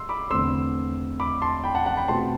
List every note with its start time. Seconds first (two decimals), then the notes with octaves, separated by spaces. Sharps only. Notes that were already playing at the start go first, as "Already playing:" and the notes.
Already playing: C6 E6
0.09 B5 D6
0.30 E2 D3 A3 C4 C6 E6
1.20 B5 D6
1.42 A5 C6
1.64 G5 B5
1.75 F#5 A5
1.86 F#5 A5
1.97 G5 B5
2.08 B2 A3 C4 A5 C6